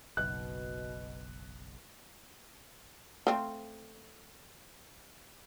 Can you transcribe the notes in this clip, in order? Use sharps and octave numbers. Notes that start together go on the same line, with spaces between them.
F#1 B1 B2 F#6
A3 C4 F4